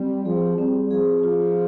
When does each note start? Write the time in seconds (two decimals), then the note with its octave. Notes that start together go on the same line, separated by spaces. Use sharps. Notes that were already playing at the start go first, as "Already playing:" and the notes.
Already playing: G3 C4
0.25 F3 G#4
0.58 G3 C4
0.90 F3 G#4
1.23 F3 F4